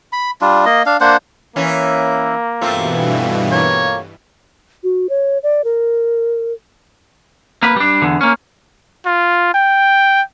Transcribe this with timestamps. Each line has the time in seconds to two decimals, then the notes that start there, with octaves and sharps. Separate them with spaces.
0.13 B5
0.41 G3 D4 F4
0.66 A#3 D#5
0.86 D4 F5
1.01 A#3 D4 C5 F#5
1.56 E3 A#3 C#4
2.61 G2 B2 E3 A3 C4 F4
3.52 A#3 C#5
4.84 F#4
5.09 C#5
5.43 D5
5.64 A#4
7.63 A#3 B4
7.76 G3 D4
8.02 E2 D3
8.21 A#3 C#4
9.06 F4
9.54 G5